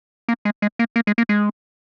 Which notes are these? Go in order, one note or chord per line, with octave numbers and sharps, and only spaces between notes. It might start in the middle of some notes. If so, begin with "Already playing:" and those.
A#3
G#3
G#3
A#3
A#3
G#3
A#3
G#3